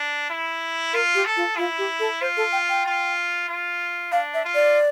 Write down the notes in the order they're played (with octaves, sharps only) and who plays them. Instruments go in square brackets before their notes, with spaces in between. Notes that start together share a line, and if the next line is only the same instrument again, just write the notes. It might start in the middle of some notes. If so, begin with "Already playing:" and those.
Already playing: [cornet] D4
E4
[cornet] F4 [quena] A#4
[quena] G4
[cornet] A4
[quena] F4
[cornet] E4 [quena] F4
[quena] G4
A4
[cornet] F4 [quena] C5
[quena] A4
G5
G5
[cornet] F4
F4
[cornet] D4 [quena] F5
[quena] E5
[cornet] F4
[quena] D5